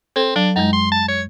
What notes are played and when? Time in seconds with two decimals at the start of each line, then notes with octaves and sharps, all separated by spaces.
0.16 C4 A4
0.36 F#3 D4
0.56 F#2 G#3 D#4
0.73 C6
0.91 A5
1.08 C#5